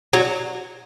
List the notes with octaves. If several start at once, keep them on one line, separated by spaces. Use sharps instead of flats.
F#3